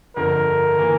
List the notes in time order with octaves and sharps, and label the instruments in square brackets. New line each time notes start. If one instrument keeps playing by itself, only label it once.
[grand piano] G1 F2 D3 [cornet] A#4
[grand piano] E3 A#3